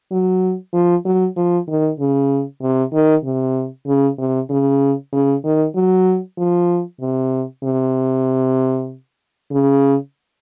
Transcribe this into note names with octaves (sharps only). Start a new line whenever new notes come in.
F#3
F3
F#3
F3
D#3
C#3
C3
D#3
C3
C#3
C3
C#3
C#3
D#3
F#3
F3
C3
C3
C#3